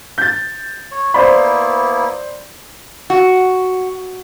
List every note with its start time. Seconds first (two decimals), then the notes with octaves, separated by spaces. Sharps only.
0.18 G6 A6
0.91 C#5
1.14 A#3 B3 E4 C5 D5 B5
3.10 F#4